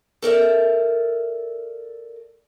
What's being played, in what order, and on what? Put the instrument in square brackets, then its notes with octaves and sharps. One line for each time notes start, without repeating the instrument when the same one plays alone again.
[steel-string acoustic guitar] A4 A#4 D5 E5